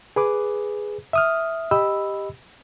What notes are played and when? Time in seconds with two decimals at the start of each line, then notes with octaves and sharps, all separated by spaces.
0.16 G#4 B4 D6
1.13 E5 D#6 F6
1.71 G4 D#5 B5 E6